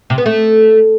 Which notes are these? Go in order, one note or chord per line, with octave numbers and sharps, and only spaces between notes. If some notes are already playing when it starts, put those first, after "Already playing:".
C3
B3
A3